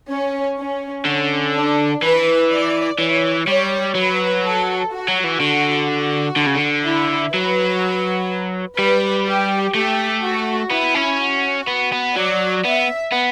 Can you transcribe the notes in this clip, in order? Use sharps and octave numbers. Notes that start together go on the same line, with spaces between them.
C#4
C#4
D3 C#4
D4
E3 B4
D5
E3 C#5
G3 C#5
F#3 B4
A4
F#4
F#3
E3
D3 F#4
F#4
D3
C#3
D3
E4
F#3 B4
G3 B4
G4
A3 G4
F#4
B3 E4
C#4
F#4
B3
B3
F#3 D5
B3 E5
B3